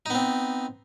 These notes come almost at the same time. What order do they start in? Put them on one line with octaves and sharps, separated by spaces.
D#4 B3 C4